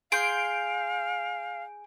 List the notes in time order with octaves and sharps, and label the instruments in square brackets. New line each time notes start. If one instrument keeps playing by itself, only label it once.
[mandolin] G#4 C6 [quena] F5 [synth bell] G6 D7